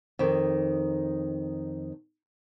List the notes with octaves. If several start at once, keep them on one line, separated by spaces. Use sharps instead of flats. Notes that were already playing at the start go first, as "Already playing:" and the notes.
F2 D#3